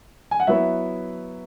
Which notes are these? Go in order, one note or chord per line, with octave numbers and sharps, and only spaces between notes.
G#5
F#5
F#3 B3 E4 E5